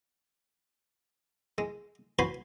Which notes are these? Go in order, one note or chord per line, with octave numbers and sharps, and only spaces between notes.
G#3
F#4 B4 C5 G#5 B5 C6